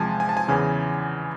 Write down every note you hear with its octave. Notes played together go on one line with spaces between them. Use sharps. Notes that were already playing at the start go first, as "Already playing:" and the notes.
Already playing: E2 C3 F3 G#3 G#5 A5
G#5
A5
G#5
E2 C#3 E3